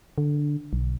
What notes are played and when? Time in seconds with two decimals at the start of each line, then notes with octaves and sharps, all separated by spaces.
0.18 D3
0.73 B1